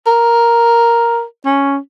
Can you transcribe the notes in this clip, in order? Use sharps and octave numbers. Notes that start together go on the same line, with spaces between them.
A#4
C#4